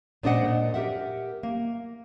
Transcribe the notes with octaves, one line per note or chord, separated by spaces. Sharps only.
A#2 G#3 D4 C5 D#5 F#5
A#2
G4 A#4 E5 F#5
A#3